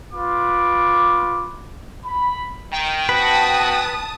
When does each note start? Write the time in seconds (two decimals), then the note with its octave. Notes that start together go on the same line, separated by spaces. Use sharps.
0.12 F4 B4 D6
2.04 B5
2.72 D#3 G5
3.09 C4 F#4 B4 A5 D#6